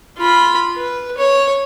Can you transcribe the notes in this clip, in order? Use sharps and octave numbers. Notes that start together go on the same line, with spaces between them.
F4 B5
B4
C#5